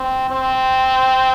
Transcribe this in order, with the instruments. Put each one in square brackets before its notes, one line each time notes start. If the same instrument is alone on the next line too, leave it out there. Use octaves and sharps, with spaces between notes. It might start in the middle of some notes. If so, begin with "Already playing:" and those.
Already playing: [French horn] C4
C4